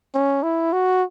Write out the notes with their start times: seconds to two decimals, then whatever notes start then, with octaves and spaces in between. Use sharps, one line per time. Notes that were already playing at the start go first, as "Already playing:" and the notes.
0.14 C#4
0.43 E4
0.73 F#4